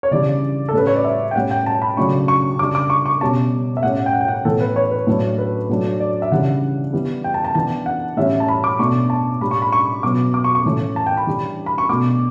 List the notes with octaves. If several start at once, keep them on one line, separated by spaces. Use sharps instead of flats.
C#5
C#3 E3 G3 D4 D5
A4
A2 G3 C#4 B4
C#5
D5
E5
G5
A2 G3 C#4 F#5
G5
A5
B5
C#3 F#3 A3 D4 C#6
C#6
C#3 G3 D4 D6
D6
C#6
C#6
B2 G3 C#4 A5
E5
A2 G3 C#4 F#5
F#5
G5
F#5
G5
F#5
A2 E3 B3 A4
B4
C#5
B4
A2 F#3 A3 D4
B4
A2 F#3 A3 D4
D5
E5
C#3 E3 G3 D4 F#5
E3 G3 B3
G5
A5
A5
E3 B3 D4 A5
F#5
A2 E3 G3 C#4 E5
A5
B5
D6
B2 A3 D4 C#6
A5
A2 G3 D4 B5
C#6
B5
C#6
B2 F#3 B3 D6
D6
C#6
C#6
A2 E3 A3 C#4
A5
G5
B5
E3 G3 D4
B5
C#6
B2 A3 D4 D6